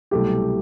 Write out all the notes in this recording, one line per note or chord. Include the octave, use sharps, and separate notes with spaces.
C2 B2 F#3 A3 G4